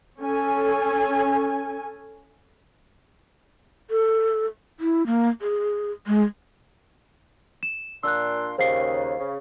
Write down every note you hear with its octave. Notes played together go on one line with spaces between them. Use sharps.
C#4 A4 G#5
A4
E4
A#3
G#4
G#3
E7
A#2 D4 C6 E6 F#6
D#2 C#3 C5 F5 C7
C#3